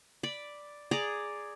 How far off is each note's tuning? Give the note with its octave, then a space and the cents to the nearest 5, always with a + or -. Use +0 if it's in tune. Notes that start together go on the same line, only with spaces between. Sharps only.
D5 +0 B5 +0
G#4 +0 D5 +0 A#5 +0